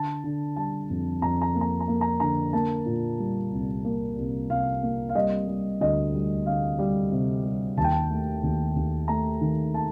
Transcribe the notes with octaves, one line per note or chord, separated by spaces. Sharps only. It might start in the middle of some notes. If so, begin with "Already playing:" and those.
Already playing: D3 A5
D3
G3 A5
F2
F2 A#5
A#5
A#3
A#5
A#5
A#3
A#5
D3 A#5
A#3 A5
A#2
G3
C2
A#3
C2
C2 F5
A#3
F5
G3 D#5
G3
D2 D#5
G3
D2 F5
G3
C3
G3
D#2 A5
G5
A5
A3
D#2
D#2
A3 A#5
D#3
A5